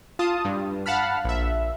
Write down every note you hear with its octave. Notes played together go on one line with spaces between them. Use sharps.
F4 A5 D#6
G2
F5 F#5 A5 B5 F6
A#1 E5